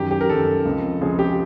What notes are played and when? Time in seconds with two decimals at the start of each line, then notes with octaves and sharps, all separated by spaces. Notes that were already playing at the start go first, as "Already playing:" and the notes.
Already playing: F#2 D#3 F#3 G4
0.11 G4
0.21 A#4
0.29 F#2 D#3 F#3 A4
0.65 C#2 C3 F3
1.01 C#2 C3 F3 G#4
1.19 G4